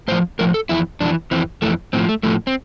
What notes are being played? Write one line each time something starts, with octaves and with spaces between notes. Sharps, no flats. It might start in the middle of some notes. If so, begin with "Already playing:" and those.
A2 F3 C5
A2 F3 A#4
A4
F2 E3 E4
F2 E3 D4
F2 E3 C4
F2 E3 A3
A2 F3 C4
A3
A2 F3 A3
C4